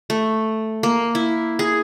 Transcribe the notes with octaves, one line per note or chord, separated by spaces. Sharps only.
A3
A#3
E4
G#4